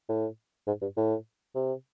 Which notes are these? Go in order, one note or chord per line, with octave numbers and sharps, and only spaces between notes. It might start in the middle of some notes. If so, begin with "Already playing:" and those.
A2
G#2
G2
A2
C3